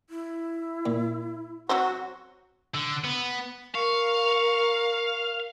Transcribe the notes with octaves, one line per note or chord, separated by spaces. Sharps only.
E4
A#2
F#3 C4 F#4 C5
D3
B3
A#4 F5 C#6